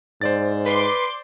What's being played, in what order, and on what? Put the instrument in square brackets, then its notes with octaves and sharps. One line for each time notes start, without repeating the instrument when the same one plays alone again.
[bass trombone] G#2 [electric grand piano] C5 D5 A6
[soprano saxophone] B4 [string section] C6 D6